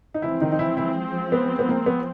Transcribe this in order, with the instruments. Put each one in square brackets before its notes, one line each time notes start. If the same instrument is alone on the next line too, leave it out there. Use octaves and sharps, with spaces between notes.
[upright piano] D#4
[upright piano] E3 E4 [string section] F3 G#3 C4
[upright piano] D#3 D#4
D#4
E3 E4
E3 E4
B3
B3
A#3
B3